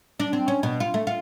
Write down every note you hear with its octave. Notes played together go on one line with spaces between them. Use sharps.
D4
C4
C#4
B2
F4
A3
F4